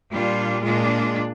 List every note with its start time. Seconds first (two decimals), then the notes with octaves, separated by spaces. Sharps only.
0.11 A#2 G3 D4 F4
0.63 A#2 G#3 D4 F4